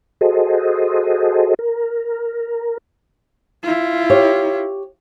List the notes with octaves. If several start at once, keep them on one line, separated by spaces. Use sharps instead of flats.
F#4 G#4 A4 C5 D#5
A#4
E4 F4
G4 C#5